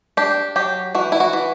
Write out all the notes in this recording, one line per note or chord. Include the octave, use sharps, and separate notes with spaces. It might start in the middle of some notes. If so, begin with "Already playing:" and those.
D4 G4
F#3 G4
E3 F#4
E4
F#4
E3